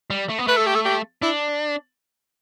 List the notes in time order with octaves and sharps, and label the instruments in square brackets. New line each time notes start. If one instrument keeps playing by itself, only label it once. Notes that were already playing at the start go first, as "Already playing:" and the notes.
[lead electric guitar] G3
A3
B3
[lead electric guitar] A3 [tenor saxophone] B4
[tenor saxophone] A4
G4
A4
G4
[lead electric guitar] D4 [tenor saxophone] E4